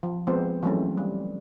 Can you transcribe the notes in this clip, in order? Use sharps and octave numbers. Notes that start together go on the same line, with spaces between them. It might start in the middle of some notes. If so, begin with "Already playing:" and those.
F3
F3 G#3 B3 C4 C5
E3 F#3 G#3 A3 C4 C#4
G3